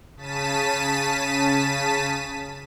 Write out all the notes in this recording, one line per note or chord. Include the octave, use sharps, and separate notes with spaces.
C#3 A5 B6 D#7